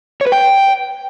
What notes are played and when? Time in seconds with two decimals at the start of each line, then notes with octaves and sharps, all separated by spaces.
0.21 C#5
0.27 B4
0.32 G5